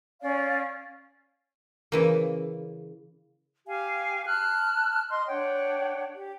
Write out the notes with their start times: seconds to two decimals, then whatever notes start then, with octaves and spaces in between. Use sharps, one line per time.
0.21 C#4 D5 F5
1.92 C#3 E3 A#3
3.68 G4 F5 G#5
4.26 A5 F6 F#6
5.09 D#5 C6
5.28 D4 C#5 F#5 G5
6.15 G4